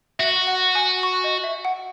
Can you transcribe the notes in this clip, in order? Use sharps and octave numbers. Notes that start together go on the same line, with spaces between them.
F#4 E5
F#5
G#5
C#6
D#5
E5
F#5